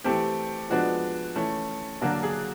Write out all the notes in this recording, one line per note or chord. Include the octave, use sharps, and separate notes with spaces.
E3 A3 C4 G4
F3 G#3 B3 D4 F#4
E3 A3 C#4
D3 F#3 A#3 D4 F#4
G#4